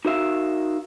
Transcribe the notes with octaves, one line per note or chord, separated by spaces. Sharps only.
D#4 F#4 A#4 D5 E5 F5